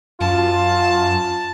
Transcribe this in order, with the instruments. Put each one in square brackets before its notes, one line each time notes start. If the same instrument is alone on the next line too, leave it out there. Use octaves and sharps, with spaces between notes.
[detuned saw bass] F#2 [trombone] F4 [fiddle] A5